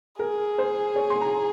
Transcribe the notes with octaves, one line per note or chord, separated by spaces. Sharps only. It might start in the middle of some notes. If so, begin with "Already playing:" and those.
G#4 A#4
C5
C#5
C6
A#5